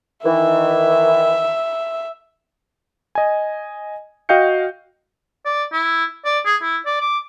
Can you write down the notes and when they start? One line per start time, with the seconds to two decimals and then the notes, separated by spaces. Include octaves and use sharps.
0.24 D#3 E3 E5
3.15 D#5 G#5
4.29 F#4 D#5 F5 G5 G6 C#7
5.45 D5
5.73 E4
6.25 D5
6.46 G#4
6.62 E4
6.86 D5
7.01 D6